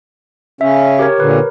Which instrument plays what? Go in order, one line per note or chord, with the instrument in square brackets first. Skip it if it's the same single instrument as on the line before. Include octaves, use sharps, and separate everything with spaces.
[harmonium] C#3 C#4 [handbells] E5
[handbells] G4 A#4 C#5
[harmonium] A#2 D3 [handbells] A#4 B4